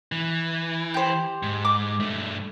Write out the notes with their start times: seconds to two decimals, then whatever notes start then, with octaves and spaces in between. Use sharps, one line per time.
0.12 E3
0.94 G4 C5
1.43 G#2
1.65 D6
2.00 G2 A3